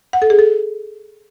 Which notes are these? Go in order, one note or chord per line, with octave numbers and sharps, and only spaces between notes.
F#5
A4
G#4
A4